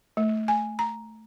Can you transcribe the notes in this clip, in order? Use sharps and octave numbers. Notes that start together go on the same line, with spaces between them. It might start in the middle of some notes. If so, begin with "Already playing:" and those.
A3
G#5
A#5